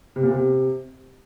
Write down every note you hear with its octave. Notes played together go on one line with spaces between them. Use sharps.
C3
A#2
C3